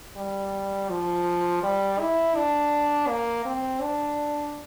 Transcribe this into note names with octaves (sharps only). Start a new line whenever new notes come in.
G3
F3
G3
E4
D4
A#3
C4
D4